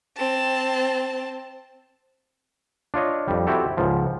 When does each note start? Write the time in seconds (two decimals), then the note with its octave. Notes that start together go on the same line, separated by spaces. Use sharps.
0.17 C4 A5
2.94 D4 F4 C#5 D#5
3.28 F2 G3
3.47 C4 E4 F#4 G4 A4
3.77 C#2 G#2 F3